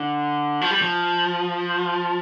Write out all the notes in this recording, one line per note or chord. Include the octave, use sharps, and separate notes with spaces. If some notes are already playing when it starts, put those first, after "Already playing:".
Already playing: D3
F3
G3
F3